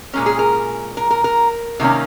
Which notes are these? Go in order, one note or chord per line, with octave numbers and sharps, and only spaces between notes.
A#2 G#3 C#4 A#4
G#4
A#4
A#4
A#4
A#4
C3 D#3 A#3 C#4